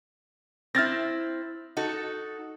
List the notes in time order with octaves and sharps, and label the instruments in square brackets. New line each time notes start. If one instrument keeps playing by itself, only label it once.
[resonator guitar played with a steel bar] C4 E4 [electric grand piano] F6 A6 A#6
[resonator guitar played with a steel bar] D#4 F#4 A4